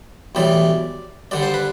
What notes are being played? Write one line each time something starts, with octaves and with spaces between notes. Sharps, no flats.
B1 A2 E3 G3 D5
G2 D3 G3 D5
C5
B4